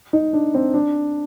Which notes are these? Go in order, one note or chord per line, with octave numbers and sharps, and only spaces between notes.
D#4
D4
C4
D4